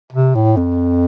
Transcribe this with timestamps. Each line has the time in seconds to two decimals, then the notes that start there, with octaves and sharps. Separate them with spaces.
0.13 C3
0.35 A2
0.56 F2